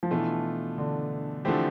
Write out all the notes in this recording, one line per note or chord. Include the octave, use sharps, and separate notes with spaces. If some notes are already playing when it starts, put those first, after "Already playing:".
F3
B2 E3 A3 D4 F4
D3
D3 E3 F3 A3 C4 G4